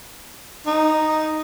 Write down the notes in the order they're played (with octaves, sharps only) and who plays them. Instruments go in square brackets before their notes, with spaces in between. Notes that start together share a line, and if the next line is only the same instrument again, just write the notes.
[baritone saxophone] D#4